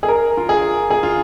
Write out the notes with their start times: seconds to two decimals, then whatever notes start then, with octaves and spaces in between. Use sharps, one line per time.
0.03 G#4
0.08 A#4
0.37 F4
0.49 G#4
0.90 G#4
1.03 F4